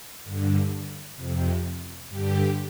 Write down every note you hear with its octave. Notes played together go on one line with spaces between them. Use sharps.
G2 D3
F2 C3
G2 D3 G4